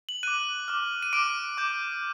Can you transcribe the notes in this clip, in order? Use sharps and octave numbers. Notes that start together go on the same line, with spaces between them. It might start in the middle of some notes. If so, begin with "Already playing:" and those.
F#7
D6 F#6 D#7
D6 F6
D#7
D6 F6 D7
D6 G6